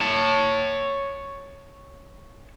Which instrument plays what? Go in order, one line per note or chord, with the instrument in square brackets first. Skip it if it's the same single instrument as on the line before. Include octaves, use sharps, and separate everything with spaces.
[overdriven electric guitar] C#5 A5